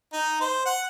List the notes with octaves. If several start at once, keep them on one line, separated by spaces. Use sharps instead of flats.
D#4
C5
F#5